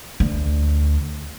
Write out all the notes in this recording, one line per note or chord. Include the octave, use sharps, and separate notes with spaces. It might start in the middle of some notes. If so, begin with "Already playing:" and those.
D2